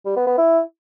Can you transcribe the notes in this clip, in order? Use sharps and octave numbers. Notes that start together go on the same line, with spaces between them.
G3
B3
B3
E4